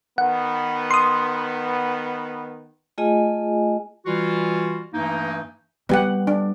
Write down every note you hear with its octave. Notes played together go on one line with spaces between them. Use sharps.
D#3 B3 F#5
C6 D#6
A3 F4 G#4 D#5 G#5
E3 G3 F4 F#4
G2 E3 A3 A#3 D#4
G3 B3 G4 F#5
D4